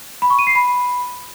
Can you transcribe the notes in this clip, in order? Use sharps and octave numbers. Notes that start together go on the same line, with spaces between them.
B5
C#6
D#7
C7
B5